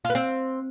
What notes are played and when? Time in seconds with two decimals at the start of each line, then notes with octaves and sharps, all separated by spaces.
0.05 F4
0.10 B4
0.15 C4